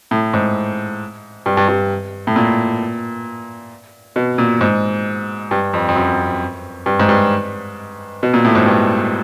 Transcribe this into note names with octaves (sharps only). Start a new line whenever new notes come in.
A2
G#2
G2
G2
G2
A2
A#2
B2
A#2
G#2
G2
F2
F2
F#2
G2
G#2
G2
B2
A#2
A2
G#2
G2